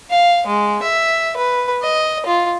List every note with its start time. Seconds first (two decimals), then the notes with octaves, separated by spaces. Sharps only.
0.10 F5
0.47 G#3
0.82 E5
1.37 B4
1.82 D#5
2.26 F4